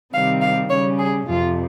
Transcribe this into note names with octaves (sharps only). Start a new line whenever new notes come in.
C3 D#3 G3 C4 F5
F5
C#3 G3 C#4 C#5
G#4
F2 C3 F3 F4